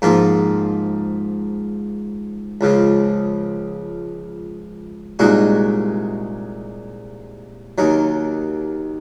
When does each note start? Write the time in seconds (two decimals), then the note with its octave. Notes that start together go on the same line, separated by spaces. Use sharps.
0.02 G#2 F3 A#3 F4
2.61 C#2 C#3 F3
5.19 C2 A#2 G#3 D#4 F#4
7.78 D#2 D#3 F#3